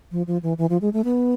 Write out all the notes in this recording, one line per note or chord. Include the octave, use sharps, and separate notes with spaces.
F3
F3
E3
E3
F3
G#3
A3
B3